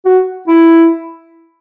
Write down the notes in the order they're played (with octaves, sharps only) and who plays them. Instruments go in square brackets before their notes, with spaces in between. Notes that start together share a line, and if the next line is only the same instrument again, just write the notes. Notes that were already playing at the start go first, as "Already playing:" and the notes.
[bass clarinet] F#4
E4